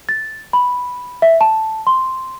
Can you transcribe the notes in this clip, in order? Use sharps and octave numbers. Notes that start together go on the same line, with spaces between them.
A6
B5
E5
A5
C6